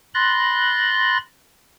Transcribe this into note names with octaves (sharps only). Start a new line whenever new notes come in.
B5 C6 F#6 A6 A#6